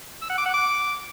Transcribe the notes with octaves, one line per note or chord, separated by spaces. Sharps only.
E6
F#5
D6
F#5
D6